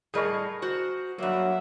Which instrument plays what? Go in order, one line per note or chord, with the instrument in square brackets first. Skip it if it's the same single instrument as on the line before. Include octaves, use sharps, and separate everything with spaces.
[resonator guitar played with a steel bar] A2 G3 D#5 [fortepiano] G#4 A#4 C#6
[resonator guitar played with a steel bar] F#4 C5
[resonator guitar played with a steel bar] G2 A#3 [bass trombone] F#3 [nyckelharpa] E5 F#5